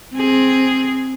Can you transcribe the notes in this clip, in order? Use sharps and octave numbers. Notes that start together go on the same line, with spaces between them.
C4 G#4